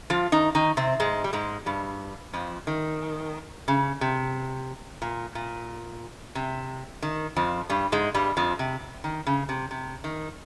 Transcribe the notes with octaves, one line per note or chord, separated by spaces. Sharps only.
F3 F4
D#3 D#4
D#3 D#4
C3 C4
G#2 G#3
G3
G#2 G#3
G2 G3
F2 F3
D#3
C#3
C3
A#2
A#2
C3
D#3
F2 F3
G2 G3
G#2 G#3
G2 G3
F2 F3
C3
D#3
C#3
C3
C3
D#3